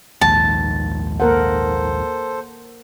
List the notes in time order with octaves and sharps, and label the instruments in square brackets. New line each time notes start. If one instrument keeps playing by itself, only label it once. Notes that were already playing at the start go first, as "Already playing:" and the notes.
[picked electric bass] A#1 D#2 G#2 [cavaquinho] A5
[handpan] A#3 A#4 F#5 [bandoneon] A4 C5